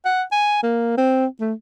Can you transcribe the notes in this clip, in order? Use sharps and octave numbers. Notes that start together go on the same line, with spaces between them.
F#5
G#5
A#3
C4
A3